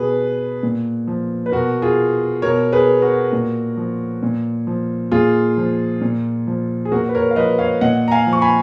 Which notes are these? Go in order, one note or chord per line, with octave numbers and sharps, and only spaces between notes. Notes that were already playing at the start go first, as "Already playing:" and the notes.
Already playing: B2 G#4 B4
A#2
F3
B4
B2 F#4 A#4
F4 G#4
B2 A#4 C#5
G#4 B4
F#4 A#4
A#2
F3
A#2
F3
A#2 F4 G#4
F3
A#2
F3
G#4
A#2 F#4 A#4
B4
A#4 C#5
F5
F3 B4 D#5
C#5 F5
A#2 D#5 F#5
A#5
F5 G#5
F3
C#6
G#5 B5